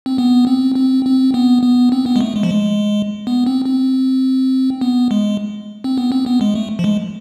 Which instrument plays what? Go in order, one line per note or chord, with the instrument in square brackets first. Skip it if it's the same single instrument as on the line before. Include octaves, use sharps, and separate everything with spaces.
[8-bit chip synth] C4
B3
C4
C4
C4
B3
B3
C4
B3
G#3
A3
G#3
F3
G#3
B3
C4
C4
B3
G#3
C4
B3
C4
B3
G#3
A3
F3
G#3